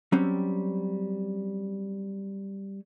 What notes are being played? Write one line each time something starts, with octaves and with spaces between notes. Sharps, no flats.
F#3 G3 C4 C#4